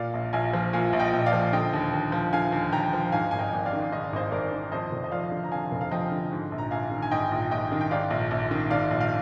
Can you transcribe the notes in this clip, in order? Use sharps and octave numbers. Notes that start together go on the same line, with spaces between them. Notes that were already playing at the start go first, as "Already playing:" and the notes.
Already playing: A#2 D5 F5
A#1
A#1 F5 G#5
F3
A#2 F5 G#5
A#1
D#5 G5
A#1
D#5
D5 F5
F3
D3 D#5 G5
D#2
D#2
F3
D3 F5 G#5
D#2
D#2 G5 A#5
F3
G#2 F5 G#5
G#1 G#5
D#5 G5
G#1
D5 F5
D#3
G#2 D#5
F5
G#1 C5 D#5
G#1 A#4 D5
D#3
F2 C5 D#5
F1
D#5
F3 D5 F5
D3
A#5
F2 F5 G#5
F1
F5
F3 D#5 G5
D3
G#2
A#1
A#5
A#1 F5 G#5
D#3
G#5
G#2 D#5 G5
A#1
A#1 D#5 G5
D#3
G5
G#2 D5 F5
A#1
A#1
D#3
G#2 D5 F5
A#1
F5